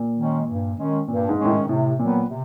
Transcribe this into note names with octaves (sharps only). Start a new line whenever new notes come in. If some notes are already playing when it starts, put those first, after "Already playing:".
Already playing: A#2
D#3 G#3 C#4
G2
D#3 G#3 C#4
G2 A#2
G#2
D#3 G#3 C#4
A2
G#2
A2 C3
A#2 D#3 F#3 B3
C3